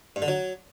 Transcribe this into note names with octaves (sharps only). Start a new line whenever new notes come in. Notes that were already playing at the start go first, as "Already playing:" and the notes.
G2
D3
F#3